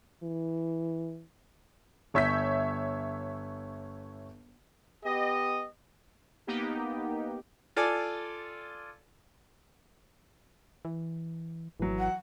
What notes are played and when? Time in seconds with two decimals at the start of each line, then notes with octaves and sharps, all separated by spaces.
0.23 E3
2.14 G1 C#5 E5 G6 B6
5.04 B3 G4 D#5
6.47 A#3 B3 D#4 G4
7.76 F4 A4 D5 G#5
10.85 E3
11.80 G#1 E3 F#3
11.99 F#5